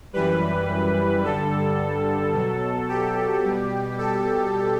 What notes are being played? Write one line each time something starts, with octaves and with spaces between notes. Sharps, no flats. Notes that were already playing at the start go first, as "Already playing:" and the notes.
F#2 E3 G3 B4
G2 D3 G3 A4
B2 F#3
G4
B2 G3
A4